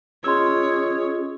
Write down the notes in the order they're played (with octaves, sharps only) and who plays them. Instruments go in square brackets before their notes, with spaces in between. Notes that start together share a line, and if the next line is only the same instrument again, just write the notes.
[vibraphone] C#4 F4 D#5 [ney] G#4 [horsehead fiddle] C#5 [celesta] C6 E6